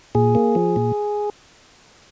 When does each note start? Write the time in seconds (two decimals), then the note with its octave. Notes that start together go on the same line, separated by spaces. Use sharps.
0.15 A#2 G#4
0.35 A#3
0.55 F3
0.76 A#2